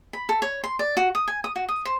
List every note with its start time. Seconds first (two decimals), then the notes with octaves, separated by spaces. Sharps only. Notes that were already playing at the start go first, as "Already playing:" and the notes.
0.13 B5
0.29 A4
0.42 C#5
0.64 C6
0.79 D5
0.97 F#4
1.15 D#6
1.28 G#5
1.44 D#6
1.56 F#4
1.69 D#6
1.85 C5